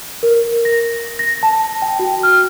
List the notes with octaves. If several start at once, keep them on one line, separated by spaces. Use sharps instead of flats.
A#4
A#6
A#6
A5
G5
F#4
F6